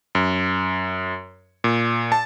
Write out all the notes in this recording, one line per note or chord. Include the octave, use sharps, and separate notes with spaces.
F#2
A#2
A5